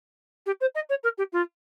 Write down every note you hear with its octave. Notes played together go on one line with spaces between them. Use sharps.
G4
C5
D#5
C#5
A#4
G4
F4